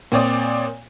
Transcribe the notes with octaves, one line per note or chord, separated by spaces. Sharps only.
A#2 C4 C#5 D5 D#6